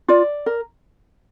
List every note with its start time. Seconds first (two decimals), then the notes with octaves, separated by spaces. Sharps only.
0.08 F4 D5
0.46 A#4